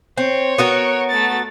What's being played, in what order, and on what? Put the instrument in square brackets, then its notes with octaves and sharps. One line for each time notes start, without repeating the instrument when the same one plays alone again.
[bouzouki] C4 [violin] C#5
[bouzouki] B3 F#4 A#4
[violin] A3 A6